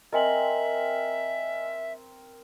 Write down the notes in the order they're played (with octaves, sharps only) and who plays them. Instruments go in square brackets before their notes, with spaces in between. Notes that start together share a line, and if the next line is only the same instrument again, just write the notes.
[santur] C4 A#4 [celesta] D#5 G#5 F#7 [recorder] E5